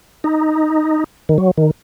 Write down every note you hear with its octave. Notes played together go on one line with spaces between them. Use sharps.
D#4
D#3
F#3
D#3